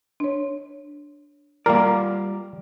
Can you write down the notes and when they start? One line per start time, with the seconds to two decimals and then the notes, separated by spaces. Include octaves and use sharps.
0.20 D4 C#5
1.66 G3 A#3 F4 A#4 D5